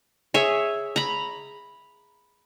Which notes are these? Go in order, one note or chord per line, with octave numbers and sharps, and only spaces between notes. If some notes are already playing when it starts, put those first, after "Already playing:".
G#4 C#5 E5
A#5 B5